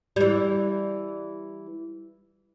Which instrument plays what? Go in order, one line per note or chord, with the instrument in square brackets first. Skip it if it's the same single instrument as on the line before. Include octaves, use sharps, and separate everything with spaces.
[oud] E3 G3